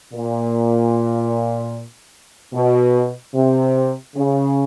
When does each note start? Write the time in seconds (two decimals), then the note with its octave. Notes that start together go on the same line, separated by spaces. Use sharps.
0.13 A#2
2.54 B2
3.34 C3
4.15 C#3